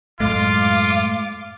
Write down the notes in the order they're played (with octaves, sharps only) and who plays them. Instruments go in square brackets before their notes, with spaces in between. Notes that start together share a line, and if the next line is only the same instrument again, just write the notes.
[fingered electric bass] F#2 A2 A3 [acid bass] G#3 [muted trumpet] F4 [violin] F5 D6